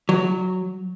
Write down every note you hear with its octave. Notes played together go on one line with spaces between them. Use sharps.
F#3